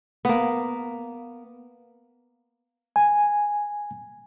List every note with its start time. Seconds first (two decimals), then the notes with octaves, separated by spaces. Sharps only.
0.25 A#3 B3
2.96 G#5